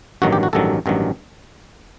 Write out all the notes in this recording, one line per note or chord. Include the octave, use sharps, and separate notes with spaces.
A1 G2 D#3 F#3 F#4
G4
F#4
A1 G2 D#3 F#3 A4
A1 G2 D#3 F#3